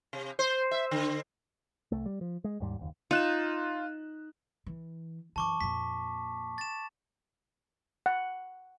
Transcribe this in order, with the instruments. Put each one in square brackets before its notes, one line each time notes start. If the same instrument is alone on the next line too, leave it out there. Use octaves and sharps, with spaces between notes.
[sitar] C3
C5
E5
D3
[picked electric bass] C2 A3
G3
F3
G#3
D#2 G#2 G3
F#1 D#2
[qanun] D#4 [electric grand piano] F4 F#6 E7
[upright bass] E3
[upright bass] F#2 E3 [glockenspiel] A5 C#6 D6
[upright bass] F2 A#2 [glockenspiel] B6
[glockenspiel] A6 E7
[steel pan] F#5